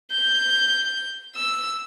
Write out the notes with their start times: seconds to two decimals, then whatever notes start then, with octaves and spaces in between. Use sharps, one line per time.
0.11 G6
1.36 E6